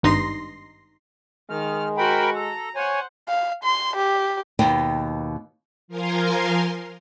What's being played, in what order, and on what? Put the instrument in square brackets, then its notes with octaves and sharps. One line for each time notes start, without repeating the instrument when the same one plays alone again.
[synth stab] G#1 G2 D#4 C6 A#6 C7
[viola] D#3 [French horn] G#3 [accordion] F6
[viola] F#4 C5 [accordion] A#4 G5 B5
[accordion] A4 [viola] A#5
[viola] C5 F#5 [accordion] C#5 G#5
[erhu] F5
C6
G4
[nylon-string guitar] D#2 B2 B3 D#4 G5
[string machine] F3 A#4 F5 G#5 A#5 C6